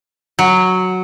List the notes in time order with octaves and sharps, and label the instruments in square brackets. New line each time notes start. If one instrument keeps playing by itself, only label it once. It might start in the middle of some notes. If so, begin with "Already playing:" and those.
[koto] F#3